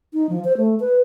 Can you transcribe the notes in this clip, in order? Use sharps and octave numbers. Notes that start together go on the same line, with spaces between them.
D#4
F3
C5
A3
B4